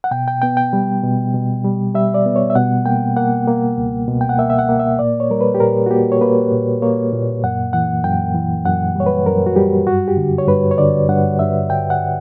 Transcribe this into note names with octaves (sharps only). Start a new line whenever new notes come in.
F#5
B2 G5
G5
B3 G5
G5
G3
B2
B2
G3
G3 E5
D5
B3
C#5
E5
B2 F#5
A#3 G5
A#3 F#5
A#3
C#2
B2
G5
F#5
A#3 E5
E5
F#5
A#3
E5
A#2 D5
C#5
G3 A#4
B4
G4
A#2 A#4
F#4
A#3 G4
C#5
A#3 B4
A#2
A#3 C#5
A#2
F#2 F#5
E3 F#5
F#2 G5
E3
F#2 F#5
G3 C#5
B4
F#2 A#4
F#4
G3 G4
G2 F#4
G4
D3
C#5
G2 B4
C#5
D3 D5
G2 F#5
G2 E5
G2 G5
F#5